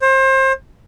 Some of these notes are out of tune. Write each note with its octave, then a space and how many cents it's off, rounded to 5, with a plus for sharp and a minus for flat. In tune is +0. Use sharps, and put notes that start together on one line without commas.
C5 +30